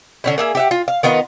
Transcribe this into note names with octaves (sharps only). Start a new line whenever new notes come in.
D3 C#4 E4
A#3 G#4 E5
G4 E5 F#5
F4
F5
D#3 B3 F4 D#5